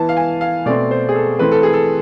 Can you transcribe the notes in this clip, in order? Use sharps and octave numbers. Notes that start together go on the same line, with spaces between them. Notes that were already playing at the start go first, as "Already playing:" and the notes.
Already playing: E3 B3 A5
F5
G#5
F5
B2 A3 C4 D5
C5
G#4
A4
E3 A3 C4 B4
A4
G#4
A4